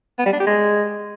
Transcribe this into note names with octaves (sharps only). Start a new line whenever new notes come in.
B3
G3
D4
G4
G#3